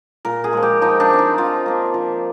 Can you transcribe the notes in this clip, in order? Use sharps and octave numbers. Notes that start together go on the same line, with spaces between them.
A#2 A#4
G#4
F3 G#3
G4
F3 D#4
D4
G#3 C4
D#4
F3 F4
A#3 D4
F3